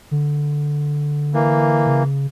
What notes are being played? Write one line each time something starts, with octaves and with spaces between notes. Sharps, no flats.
D3
E3 A#3
C#3